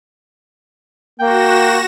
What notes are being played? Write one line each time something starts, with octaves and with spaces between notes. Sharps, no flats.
A#3 F#4 G5 A#6 E7